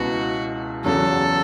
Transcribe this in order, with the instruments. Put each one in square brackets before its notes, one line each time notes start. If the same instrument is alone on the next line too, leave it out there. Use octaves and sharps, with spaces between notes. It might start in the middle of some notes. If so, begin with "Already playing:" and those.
Already playing: [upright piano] C#2 B2 B3 E4 [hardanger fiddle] F#4
[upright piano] E2 C#3 F#3 [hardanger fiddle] A4